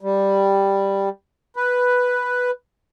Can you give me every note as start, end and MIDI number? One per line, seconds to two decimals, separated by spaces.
0.01 1.09 55
1.56 2.51 71